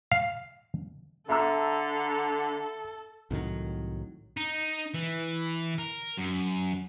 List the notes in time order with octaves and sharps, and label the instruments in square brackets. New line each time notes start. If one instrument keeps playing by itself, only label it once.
[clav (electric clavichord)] F5
[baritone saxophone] D3 [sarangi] A4 [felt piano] E5 A#5 E6
[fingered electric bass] C2 A2 D#3 F#3
[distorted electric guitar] D#4
E3
A#4
F#2